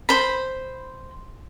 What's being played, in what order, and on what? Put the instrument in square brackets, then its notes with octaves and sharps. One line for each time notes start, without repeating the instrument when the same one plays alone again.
[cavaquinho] C5 B5